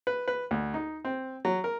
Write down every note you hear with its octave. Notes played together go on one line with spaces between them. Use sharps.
B4
B4
D2
D#4
C4
F#3
A#4